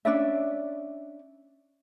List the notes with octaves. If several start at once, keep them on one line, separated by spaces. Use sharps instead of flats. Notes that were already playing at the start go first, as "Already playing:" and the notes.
C#4 D4 D5 E5